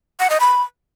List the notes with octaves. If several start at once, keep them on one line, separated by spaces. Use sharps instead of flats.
F#5
D#5
B5